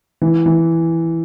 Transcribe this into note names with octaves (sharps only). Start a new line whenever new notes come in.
E3
E3